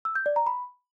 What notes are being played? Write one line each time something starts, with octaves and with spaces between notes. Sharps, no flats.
E6
G6
D5
A#5
B5